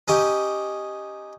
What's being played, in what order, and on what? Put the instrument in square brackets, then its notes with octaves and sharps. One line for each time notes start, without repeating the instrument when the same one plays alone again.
[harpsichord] C#4 D#4 G4